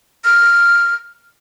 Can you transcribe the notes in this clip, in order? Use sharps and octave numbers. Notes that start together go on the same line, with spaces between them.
F6